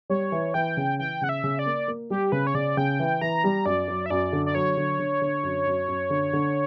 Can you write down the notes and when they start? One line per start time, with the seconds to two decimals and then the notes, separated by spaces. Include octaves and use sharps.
0.10 G3 C#5
0.32 E3
0.54 E3 G5
0.77 C#3
0.99 E3 G5
1.21 C#3 F#5
1.29 E5
1.44 C#3
1.59 D5
1.66 A#3
1.88 A#3
2.10 G3 G4
2.32 C#3 B4
2.47 C#5
2.54 C#3 D5
2.77 C#3 G5
3.00 E3
3.21 E3 A#5
3.44 G3
3.66 F#2 D5
3.88 F#3
4.06 E5
4.10 F#2 D5
4.33 D3
4.46 D5
4.55 F#3 C#5
4.77 D3
4.99 D3
5.21 D3
5.44 F#2
5.66 F#2
5.88 F#2
6.10 D3
6.33 D3